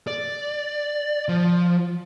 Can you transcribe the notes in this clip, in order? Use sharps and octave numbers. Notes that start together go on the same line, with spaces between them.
D5
F3